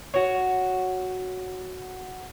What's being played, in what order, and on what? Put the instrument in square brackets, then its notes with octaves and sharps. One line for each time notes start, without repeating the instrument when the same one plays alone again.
[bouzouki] F#4 C#5